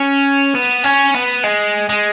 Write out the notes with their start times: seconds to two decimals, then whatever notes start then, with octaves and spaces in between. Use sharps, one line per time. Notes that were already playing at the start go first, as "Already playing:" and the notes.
Already playing: C#4
0.55 B3
0.84 C#4
1.15 B3
1.44 G#3
1.89 G#3